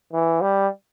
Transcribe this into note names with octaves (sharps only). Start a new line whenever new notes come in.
E3
G3